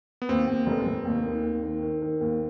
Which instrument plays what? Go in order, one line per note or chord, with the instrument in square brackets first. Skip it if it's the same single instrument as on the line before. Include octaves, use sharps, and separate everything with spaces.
[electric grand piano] B3
[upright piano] D#2 [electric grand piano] C4
[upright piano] D#2
F1
F1
D#2
D#3
D#2
D#3
D#3
D#3
D#2